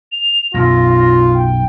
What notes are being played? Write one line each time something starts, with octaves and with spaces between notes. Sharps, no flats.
F7
B1 F#2 F4 A#6
G5